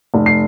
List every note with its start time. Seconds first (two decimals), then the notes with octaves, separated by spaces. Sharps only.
0.14 F1
0.26 C7